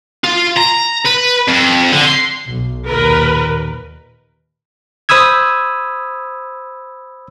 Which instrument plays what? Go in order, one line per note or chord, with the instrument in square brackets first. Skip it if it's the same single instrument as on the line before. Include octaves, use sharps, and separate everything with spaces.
[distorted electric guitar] F4
A#5
B4
F2
D3
C6
[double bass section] B1
[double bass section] D#2 A#2 [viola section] A#4 B4
[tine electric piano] C5 B5 D#6 E6 G#6